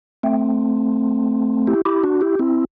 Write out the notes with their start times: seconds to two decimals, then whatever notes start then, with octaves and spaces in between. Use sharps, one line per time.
0.23 A3 C4
1.67 E4 G4
1.85 E4 G4
2.04 D4 F#4
2.21 E4 G4
2.39 C4 E4